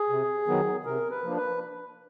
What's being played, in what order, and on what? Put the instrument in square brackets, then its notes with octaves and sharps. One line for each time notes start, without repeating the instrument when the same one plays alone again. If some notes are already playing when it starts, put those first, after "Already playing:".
Already playing: [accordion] G#4
C3
D#3 F#3 B3
C3 A#4
B4
F3 A#3 D4
B4